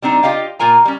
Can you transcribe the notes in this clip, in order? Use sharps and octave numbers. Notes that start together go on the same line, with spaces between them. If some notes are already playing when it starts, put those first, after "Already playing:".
G3 C4 D4 D#4
F4 G4 D#5 F5 G5
A#2 F4 A#4 G#5 A#5
G3 C#4